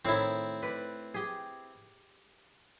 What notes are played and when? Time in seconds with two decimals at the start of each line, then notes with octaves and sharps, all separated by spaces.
0.05 A2 D#3 C4 E4
0.63 B4 D5
1.14 G4 G#4